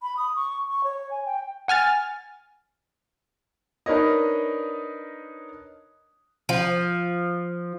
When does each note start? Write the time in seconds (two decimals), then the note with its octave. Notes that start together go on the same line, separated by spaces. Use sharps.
0.02 B5
0.17 D#6
0.36 C#6
0.68 C#6
0.84 C#5
1.11 G#5
1.26 G5
1.68 F#5 G#5 F6 A6
3.86 D4 D#4 A#4 B4 C#5 D#5
6.49 F3